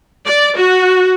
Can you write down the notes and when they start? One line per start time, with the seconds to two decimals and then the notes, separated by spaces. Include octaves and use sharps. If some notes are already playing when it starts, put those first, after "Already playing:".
0.25 D5
0.58 F#4